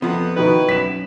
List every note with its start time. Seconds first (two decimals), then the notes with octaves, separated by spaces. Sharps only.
0.02 F2 C3 F3 B3
0.36 B2 D#3 D#4 E4 B4
0.69 F#2 B6 E7